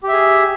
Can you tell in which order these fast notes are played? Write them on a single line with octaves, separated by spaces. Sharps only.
G4 E5 G#4